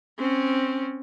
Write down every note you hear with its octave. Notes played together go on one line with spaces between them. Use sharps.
C4 C#4